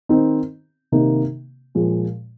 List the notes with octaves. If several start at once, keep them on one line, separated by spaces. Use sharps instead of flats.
D#3 C4 D#4
C3 D#3 A#3 D#4
A#2 F3 G#3